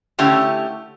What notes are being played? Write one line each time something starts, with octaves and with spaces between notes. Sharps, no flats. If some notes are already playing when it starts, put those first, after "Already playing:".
D3 A3 C#4 E4 G4